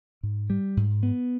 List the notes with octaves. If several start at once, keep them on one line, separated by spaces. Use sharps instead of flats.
G#2
G3
G#2
B3